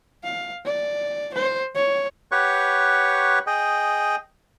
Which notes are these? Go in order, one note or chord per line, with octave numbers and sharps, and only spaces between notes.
F5
D5
C5
C#5
G4 B4 C#5 F#5 C#6
G#4 D#5 G5